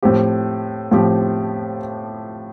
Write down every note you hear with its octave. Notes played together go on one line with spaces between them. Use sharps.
A2 F3 C4 G4
A2 F3 C4 G4